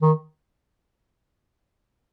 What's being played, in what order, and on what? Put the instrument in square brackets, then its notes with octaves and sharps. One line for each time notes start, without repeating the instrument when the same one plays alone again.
[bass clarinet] D#3